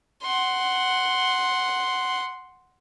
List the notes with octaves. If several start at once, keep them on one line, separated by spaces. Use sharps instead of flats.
F#5 C6